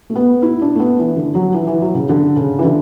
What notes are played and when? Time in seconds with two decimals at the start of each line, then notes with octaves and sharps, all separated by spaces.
0.10 A3
0.15 B3
0.42 E4
0.62 D4
0.75 A3
0.80 B3
0.99 E3
1.16 D3
1.35 F#3
1.54 E3
1.67 E3
1.82 F#3
1.94 C#3
2.09 D3
2.36 C#3
2.59 E3
2.64 D3